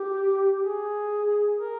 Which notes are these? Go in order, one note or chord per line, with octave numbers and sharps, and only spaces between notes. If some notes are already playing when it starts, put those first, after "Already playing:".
Already playing: G4
G#4
A#4